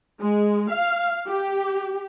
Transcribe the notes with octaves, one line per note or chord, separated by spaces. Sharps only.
G#3
F5
G4